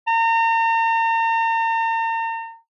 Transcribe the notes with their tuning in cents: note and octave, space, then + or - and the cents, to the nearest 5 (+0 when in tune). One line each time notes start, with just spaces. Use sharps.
A#5 -40